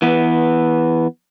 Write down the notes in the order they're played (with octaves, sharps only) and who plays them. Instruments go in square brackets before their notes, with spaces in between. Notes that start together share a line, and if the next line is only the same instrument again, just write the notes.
[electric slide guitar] E3 B3